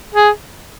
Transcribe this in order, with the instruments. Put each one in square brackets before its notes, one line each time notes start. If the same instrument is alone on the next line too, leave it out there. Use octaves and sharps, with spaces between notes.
[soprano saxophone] G#4